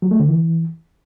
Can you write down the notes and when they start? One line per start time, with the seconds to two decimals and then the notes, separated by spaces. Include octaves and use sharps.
0.02 F#3
0.11 A3
0.20 D3
0.28 E3